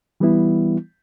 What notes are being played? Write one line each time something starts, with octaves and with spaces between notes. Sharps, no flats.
E3 G3 B3 E4